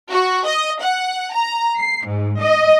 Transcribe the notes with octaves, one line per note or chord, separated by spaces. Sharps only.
F#4
D#5
F#5
A#5
C7
G#2
D#5